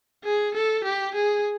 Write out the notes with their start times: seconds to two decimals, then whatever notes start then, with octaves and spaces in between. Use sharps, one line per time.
0.24 G#4
0.54 A4
0.84 G4
1.15 G#4